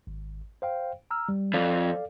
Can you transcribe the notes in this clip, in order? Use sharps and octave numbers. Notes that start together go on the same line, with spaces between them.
G#1
C5 F5 G5
A#5 E6 F6
G3
F2 A4 D5 F5